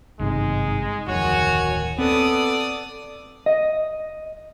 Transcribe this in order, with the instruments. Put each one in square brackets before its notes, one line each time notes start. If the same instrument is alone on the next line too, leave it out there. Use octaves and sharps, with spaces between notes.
[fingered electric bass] G#1 G2 C3 [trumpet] G#3 [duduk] D#4
[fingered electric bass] D1 F2 [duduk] D#3 [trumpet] F#4 [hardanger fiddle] C#5 G#5
[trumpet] B3 [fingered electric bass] C4 [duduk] A4 [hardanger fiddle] D5 D#6
[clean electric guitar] D#5